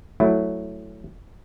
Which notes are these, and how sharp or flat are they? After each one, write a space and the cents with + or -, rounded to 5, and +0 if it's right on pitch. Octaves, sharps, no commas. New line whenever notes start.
F#3 +0 A3 +0 E4 +0